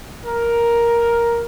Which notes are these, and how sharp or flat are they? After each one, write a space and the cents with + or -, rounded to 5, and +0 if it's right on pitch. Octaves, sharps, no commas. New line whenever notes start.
A#4 +5